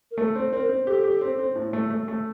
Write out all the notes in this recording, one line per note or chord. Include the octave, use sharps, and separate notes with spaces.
A#4
A3 A4
C4
C4 A#4
C4
G4 A4
G4
C4
C4
A2
A3
A3
A3